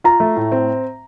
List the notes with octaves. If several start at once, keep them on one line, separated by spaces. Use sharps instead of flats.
F4 A#5
A3
A2
C4